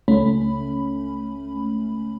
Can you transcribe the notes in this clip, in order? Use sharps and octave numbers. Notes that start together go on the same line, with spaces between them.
C#2 A3 C#4 B5